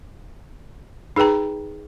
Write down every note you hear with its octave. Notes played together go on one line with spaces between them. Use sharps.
D#4 G#4 B4 G5 A#5